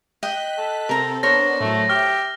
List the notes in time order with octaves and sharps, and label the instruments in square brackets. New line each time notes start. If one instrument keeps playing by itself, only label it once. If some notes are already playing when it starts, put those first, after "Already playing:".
[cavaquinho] D#5 G5 [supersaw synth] F#6 B6
[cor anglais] A4
[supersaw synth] C3 C4 [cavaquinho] A#4 A#5
[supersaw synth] B3 D4 [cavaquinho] A#4 C5 C#5 [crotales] A#6
[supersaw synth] A2 F#3 [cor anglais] A3
[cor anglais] G4 [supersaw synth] E5 [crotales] F6